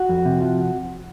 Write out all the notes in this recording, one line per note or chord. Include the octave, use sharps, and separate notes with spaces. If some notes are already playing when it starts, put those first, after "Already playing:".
Already playing: F#4
F2
C3
F3